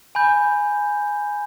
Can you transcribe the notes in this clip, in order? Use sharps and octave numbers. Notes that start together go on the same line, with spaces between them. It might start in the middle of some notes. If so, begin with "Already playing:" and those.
G#5 B5 G6